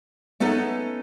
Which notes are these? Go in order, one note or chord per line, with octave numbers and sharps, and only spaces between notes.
A3 B3 C#4 D#4 A4